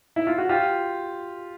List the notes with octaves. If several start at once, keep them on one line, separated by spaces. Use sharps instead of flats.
E4
F4
F#4
F4 G4